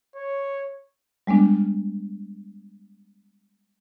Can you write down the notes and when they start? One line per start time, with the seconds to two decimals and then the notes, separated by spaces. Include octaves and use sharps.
0.16 C#5
1.27 G3 G#3 B3 D4